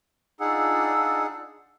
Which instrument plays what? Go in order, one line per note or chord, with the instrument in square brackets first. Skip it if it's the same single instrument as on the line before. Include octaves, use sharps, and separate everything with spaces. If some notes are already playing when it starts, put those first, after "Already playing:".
[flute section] D4 F4 E6 [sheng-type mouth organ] D#4 G#4 F#5